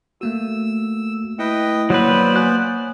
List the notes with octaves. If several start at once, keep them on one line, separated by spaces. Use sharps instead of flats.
A3 A#3 F#4 E6
A3 E4 B4 D#5 G5
F#3 A#3 B3 B4 C5 D5
C#5 G#5 F#6